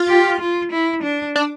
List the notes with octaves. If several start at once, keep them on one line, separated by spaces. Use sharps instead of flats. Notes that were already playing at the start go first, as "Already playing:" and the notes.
Already playing: F4
G4
F4
E4
D4
D4